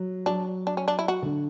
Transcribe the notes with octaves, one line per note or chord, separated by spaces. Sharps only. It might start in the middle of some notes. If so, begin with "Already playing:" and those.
Already playing: F#3
F#3 D4
D4
C#4
D4
E4
F#4
D3